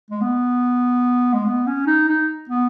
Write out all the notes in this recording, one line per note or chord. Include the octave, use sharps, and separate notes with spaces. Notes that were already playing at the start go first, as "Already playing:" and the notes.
G#3
B3
G#3
B3
C#4
D#4
D#4
B3